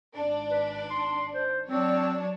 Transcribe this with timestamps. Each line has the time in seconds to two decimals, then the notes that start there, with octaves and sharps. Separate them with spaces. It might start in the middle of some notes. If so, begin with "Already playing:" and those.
0.14 G#1 D4
0.51 B4
0.90 C6
1.34 C5
1.68 F#3 C4 D4 C#5